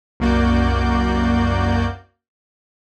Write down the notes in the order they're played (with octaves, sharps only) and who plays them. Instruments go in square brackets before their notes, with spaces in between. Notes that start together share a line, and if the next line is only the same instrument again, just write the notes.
[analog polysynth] C2 F#2 A#3 F#4 D5 G6